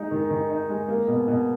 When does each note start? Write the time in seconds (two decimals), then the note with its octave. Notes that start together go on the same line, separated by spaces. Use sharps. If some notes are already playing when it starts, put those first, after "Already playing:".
Already playing: G#3 D#4
0.11 D#3
0.30 D#3
0.50 D#4
0.69 G#3
0.88 A#3
1.08 B2
1.28 B2